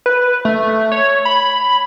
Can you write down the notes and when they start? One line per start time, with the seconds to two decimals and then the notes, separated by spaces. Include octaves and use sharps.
0.06 B4
0.45 A3
0.92 C#5
1.25 B5